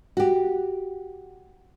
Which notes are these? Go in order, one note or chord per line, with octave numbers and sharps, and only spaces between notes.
F#4 G4